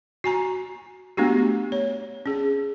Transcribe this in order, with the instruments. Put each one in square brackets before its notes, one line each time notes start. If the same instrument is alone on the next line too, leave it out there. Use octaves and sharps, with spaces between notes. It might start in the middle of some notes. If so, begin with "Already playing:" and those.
[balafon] F#4 G#5 A#5
A3 B3 D4 F#4 G4
C#5
C#4 G#4